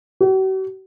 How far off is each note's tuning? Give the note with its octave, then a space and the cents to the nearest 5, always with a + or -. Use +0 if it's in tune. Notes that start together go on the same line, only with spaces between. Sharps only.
F#4 +45